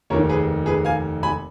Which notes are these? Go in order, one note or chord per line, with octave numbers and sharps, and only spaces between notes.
F1 D#2 D#3 A#4 C#5
G#4 B4
G#4 B4
F5 G#5
G#5 B5